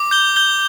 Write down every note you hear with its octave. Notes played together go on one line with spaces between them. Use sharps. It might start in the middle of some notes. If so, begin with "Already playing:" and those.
Already playing: D6
G6 G7
G6 G7